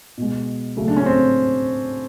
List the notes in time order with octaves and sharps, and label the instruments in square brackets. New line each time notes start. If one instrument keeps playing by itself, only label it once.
[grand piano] B2 G#3
C#3 F#3 A3
D4
C#4
C4